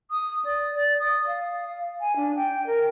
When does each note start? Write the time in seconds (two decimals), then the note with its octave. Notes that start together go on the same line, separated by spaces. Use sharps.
0.11 D#6
0.45 D5
0.74 D5
1.00 D#6
1.27 F5
2.01 G#5
2.16 D4
2.36 G5
2.67 A#4